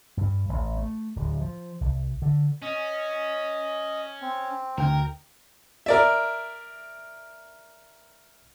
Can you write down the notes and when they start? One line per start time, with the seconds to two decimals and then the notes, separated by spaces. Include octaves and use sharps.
0.17 G2
0.49 A1
0.78 A3
1.16 D1
1.41 F3
1.81 C2
2.22 D3
2.62 C#4 D#5
4.22 C4
4.78 D2 A#4 G5
5.86 A#4 D5 E5